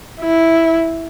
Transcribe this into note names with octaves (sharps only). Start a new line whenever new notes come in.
E4